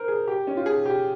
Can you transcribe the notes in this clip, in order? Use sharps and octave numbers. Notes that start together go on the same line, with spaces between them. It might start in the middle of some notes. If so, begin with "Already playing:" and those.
Already playing: A#4 C5
G#4
G4
C#4
F4
G#4
G4